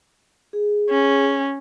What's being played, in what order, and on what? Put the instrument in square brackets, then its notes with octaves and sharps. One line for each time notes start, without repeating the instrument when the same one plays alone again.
[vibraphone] G#4
[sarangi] C#4